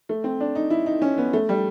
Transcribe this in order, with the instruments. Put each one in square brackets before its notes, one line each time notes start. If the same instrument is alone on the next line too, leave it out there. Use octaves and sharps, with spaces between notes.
[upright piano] A3
C4
D4
D#4
E4
D#4
C#4
B3
A3
G3